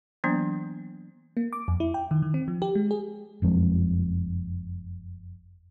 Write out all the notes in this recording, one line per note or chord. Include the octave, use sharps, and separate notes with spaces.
E3 F#3 A#3 B3 D4
A#3
D6
F2
E4
G5
D#3
D#3
C4
F3
G4
G#3
G#4
F#1 F2 F3 G#3